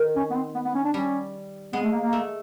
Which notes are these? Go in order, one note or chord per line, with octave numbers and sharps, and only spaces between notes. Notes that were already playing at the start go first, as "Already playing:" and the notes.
Already playing: D#3
C#4
B3
C4
B3
B3
C#4
D4
G3 C#4
G#3 B3
A3
A#3
A#3
A3